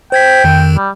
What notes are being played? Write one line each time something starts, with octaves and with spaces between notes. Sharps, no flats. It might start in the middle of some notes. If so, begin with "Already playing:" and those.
C5 G5 G#6 B6
F2 D#3
G3